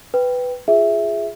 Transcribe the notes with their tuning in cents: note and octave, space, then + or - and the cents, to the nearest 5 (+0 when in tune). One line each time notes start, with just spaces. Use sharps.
B4 +10 G5 +0
F4 +0 G#4 +0 E5 +0